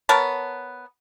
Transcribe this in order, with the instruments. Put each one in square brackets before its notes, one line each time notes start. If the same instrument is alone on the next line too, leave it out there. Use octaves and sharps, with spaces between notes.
[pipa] B3 A#4 C#5 A5